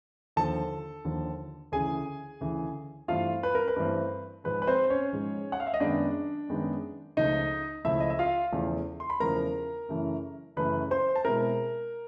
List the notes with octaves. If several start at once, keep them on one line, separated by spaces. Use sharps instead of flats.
D#2 D3 F3 A4 A5
D#2 D3 F3
D2 C#3 E3 G#4 G#5
D2 C#3 E3
G2 E3 A3 C4 F4 F5
B4
A#4
B4
G2 E3 A3 C4
G#2 F3 G#3 B4
B4
C4 C5
C#4 C#5
G#2 F3 G#3
F#5
F5
E5
D#5
F#2 D#3 G#3 B3 D4 D#4 D5
F#2 D#3 G#3 B3 D#4
C#2 C#3 F3 A3 D#4 D#5
C#2 C#3 F3 A3 E4 E5
D#5
E5
F4 F5
E2 C#3 F3 A3
C6
B5
E2 C#3 F3 A3 A#4 A#5
F#2 C#3 E3 A3
F#2 C#3 E3 A3 B4 B5
C5 C6
A5
B2 G#3 C4 E4 A#4 A#5